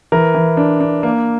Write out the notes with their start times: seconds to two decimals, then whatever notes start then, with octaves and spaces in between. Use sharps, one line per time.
0.12 E3 A#4
0.35 E3
0.57 D4
0.80 D4
1.03 A#3